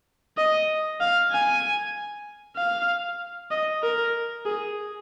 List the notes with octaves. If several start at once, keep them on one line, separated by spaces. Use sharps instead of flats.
D#5
F5
G#5
F5
D#5
A#4
G#4